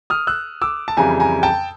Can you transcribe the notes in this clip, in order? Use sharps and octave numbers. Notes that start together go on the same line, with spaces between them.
D#6 F6
E6 F#6
D6 E6
A5
F2 C#3 E3 G3 G#5 A#5
G#5 A#5
G5 A5